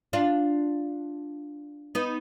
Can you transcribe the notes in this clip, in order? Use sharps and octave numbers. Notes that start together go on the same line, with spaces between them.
D4 F4
B3 D#4